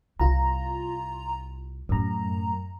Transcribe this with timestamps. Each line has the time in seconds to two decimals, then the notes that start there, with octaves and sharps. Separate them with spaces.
0.20 C2 F4 A#5
1.89 F#2 A2 A#5